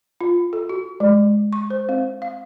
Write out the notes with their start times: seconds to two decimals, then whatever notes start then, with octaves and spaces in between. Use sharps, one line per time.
0.21 F4
0.53 A4
0.69 F#4
1.00 G#3
1.53 C#6
1.70 C5
1.89 C4
2.22 F5